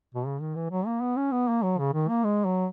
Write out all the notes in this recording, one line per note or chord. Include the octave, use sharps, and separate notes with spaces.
B2
C#3
D#3
E3
F#3
A#3
B3
C#4
B3
A#3
F#3
C#3
D#3
A#3
G#3
F#3